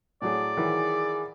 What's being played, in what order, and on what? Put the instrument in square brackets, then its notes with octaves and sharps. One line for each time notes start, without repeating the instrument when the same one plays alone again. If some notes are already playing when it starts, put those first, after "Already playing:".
[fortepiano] A2 F#3 G#4 [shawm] D5
[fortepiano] D#3 E3 F#3 [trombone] G#4